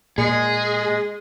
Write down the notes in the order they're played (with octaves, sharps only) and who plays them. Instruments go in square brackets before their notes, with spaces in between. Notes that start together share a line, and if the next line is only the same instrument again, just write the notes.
[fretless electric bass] A#2 [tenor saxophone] G#3 [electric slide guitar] G#4